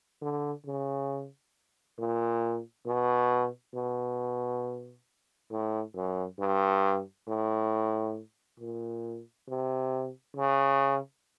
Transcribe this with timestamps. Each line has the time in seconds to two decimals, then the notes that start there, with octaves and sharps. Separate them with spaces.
0.21 D3
0.66 C#3
1.98 A#2
2.86 B2
3.74 B2
5.51 A2
5.95 F#2
6.39 G2
7.27 A2
8.60 A#2
9.48 C3
10.36 C#3